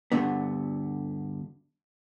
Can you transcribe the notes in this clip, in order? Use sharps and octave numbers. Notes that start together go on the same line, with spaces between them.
D2 G2 D3 B3